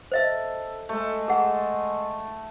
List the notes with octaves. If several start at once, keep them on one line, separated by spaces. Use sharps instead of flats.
A4 C5 D#5 E5
G#3 A3
G#4 F#5